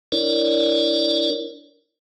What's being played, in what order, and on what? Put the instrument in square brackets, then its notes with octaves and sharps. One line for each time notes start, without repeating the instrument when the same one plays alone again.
[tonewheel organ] D4 E4 A#4 C#5 D5